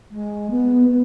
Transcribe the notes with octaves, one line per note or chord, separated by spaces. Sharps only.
G#3
B3
B3